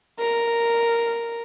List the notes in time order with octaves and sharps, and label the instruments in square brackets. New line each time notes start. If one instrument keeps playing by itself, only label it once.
[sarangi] A#4